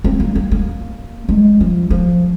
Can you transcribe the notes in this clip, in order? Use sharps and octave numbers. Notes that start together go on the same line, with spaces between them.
C4
A#3
A#3
A#3
G#3
F3
F3